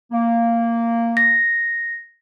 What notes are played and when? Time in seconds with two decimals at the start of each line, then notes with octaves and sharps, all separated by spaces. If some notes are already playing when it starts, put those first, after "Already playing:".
0.12 A#3
1.17 A#6